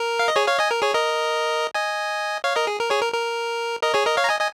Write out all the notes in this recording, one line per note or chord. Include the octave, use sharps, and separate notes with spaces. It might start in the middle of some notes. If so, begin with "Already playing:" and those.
Already playing: A#4
F5
D#5
G#4 C#5
C#5 F5
D#5 G#5
A#4
G#4 C#5
A#4 D#5
D#5 G#5
C#5 F5
A#4 D#5
G#4
A#4
G#4 C#5
A#4
A#4
A#4 D#5
G#4 C#5
A#4 D#5
C#5 F5
A#5
D#5 G#5
D#5 G#5